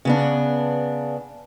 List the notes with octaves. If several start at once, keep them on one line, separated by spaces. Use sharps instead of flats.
C#3 B3 D4